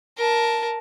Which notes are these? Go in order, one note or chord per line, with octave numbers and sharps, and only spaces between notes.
A#4 A5